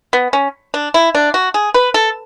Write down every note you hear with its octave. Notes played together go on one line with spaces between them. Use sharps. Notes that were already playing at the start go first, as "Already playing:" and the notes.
B3
C#4
D4
E4
D4
F#4
G#4
B4
A4